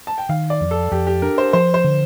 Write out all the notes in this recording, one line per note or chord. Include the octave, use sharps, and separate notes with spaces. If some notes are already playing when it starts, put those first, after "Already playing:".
A5
G5
D#3 F5
D5
F2
A4
F2 G4
G4
D4 A#4
C5
F3 C5
C5
D3